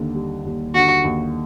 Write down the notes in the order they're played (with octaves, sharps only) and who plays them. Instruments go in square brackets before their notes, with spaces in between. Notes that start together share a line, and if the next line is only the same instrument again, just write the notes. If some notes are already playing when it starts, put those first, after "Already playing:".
Already playing: [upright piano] D#2 D3
G3
D#2
[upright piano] D3 [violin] F#4
[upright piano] D#2